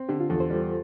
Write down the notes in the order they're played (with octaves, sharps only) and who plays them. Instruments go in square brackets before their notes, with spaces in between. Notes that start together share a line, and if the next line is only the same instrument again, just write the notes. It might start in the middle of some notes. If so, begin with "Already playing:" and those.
Already playing: [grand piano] C4
[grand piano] D3 [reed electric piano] G4
[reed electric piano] F4
[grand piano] E2 [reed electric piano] A4
[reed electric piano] C5
[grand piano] G3